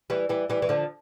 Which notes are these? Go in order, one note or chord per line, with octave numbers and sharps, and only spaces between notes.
E3 G3
E3 G3
E3 G3
E3
D3 F3